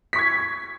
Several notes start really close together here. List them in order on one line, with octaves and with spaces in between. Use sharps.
B6 C#6 G#6